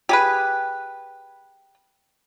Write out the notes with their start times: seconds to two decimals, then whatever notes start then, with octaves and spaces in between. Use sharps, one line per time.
0.09 G4 G#4 B4